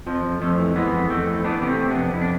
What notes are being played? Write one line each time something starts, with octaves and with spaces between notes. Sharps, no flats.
F2 F3
F2
F2 F3 A3
E3
E3 G#3 B3
F2
F2 A3 C4
E3
E3 B3 D4
C3 B3
A3 C4
C3
B3 D4
F2
F2 E4
D4